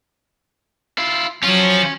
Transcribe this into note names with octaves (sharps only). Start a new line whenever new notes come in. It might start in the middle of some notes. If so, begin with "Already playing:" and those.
E4 F4
F3 F#3 C#4 F4